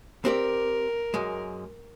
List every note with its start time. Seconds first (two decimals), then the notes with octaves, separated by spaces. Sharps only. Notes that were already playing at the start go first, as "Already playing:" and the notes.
0.25 C4 G4 A#4 D5
1.14 F#2 G#3